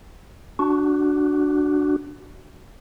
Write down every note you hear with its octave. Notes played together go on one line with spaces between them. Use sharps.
D4 F#4